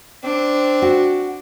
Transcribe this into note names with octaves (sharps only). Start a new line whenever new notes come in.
C4 D4
F#4